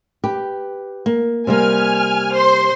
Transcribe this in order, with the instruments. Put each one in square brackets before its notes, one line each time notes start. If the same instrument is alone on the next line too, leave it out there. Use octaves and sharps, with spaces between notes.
[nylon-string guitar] G4 B4
A#3
[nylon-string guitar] C3 G3 A#3 [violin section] G#5 F6
[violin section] C5 C6